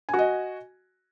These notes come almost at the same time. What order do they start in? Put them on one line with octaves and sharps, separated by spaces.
G#5 F#4 D#5